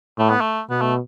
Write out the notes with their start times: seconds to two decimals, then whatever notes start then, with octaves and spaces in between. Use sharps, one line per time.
0.18 A2 A3
0.30 B3
0.41 A3
0.70 B2 B3
0.82 A3